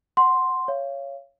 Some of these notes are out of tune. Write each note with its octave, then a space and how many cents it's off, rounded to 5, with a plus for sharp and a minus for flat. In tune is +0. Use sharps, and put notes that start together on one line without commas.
F#5 +0 C6 +0
C#5 +0 F5 -25